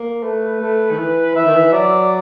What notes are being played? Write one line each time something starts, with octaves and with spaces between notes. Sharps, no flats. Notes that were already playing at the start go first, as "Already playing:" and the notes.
Already playing: A#3
A3 B4
A3
D#3
E3
E3 E5
D#3
E3
F#3 D5